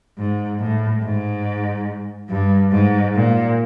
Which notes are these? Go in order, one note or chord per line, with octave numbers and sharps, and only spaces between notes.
G#2
A2
G#2
G2
G#2
A#2